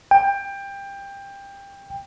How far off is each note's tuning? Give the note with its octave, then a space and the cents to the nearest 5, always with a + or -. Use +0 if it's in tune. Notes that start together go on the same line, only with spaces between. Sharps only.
G5 +20